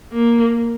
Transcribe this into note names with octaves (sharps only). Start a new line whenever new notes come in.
A#3